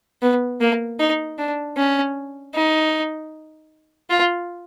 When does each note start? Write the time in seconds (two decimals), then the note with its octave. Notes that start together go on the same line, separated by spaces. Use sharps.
0.22 B3
0.61 A#3
0.99 D#4
1.38 D4
1.77 C#4
2.54 D#4
4.10 F4